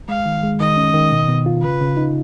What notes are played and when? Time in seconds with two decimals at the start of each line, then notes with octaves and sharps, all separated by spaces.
0.08 G#3 F5
0.26 D#3
0.43 G#3
0.60 D#3 D#5
0.77 C#4
0.94 D#3
1.11 B2
1.29 B2
1.46 F4
1.63 C#3 B4
1.81 C#3
1.97 D#4